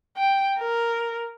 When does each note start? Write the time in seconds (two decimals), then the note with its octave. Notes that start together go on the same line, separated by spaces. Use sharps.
0.17 G5
0.59 A#4